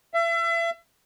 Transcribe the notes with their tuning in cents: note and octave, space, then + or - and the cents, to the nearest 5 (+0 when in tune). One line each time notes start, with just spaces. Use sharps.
E5 +35